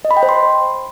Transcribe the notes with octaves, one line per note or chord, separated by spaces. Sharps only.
D#5
B5
G5
C5
C6